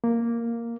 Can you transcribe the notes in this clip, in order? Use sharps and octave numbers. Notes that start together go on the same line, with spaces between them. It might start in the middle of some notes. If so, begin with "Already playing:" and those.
A#3